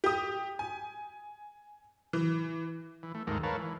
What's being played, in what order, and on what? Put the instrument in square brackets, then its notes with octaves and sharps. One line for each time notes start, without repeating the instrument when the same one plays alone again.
[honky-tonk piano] G4 D#6
G#5
E3
[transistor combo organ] E3
A3
D#2 G#2 D#3 G#3 A4 A#4
A#4 B4 C#5 F5 A5
E3